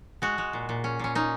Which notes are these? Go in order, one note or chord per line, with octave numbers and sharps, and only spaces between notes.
G#3 F#4
G#3
A#2
A#2
C#4
A#2 C#4
C#4 D#4